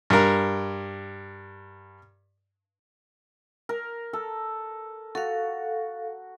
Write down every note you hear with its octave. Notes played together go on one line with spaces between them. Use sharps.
G2 A#4
A#4
A4
F#4 A4 F5